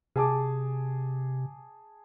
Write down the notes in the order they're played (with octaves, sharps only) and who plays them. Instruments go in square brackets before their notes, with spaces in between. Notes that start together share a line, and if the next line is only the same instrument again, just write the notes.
[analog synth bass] C3 [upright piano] G#4 A5 D6